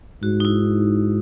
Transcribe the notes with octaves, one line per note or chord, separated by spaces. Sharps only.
G#2 F#4
D#4
E4